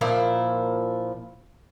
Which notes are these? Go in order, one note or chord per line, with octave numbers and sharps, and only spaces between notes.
A#2 F3 E4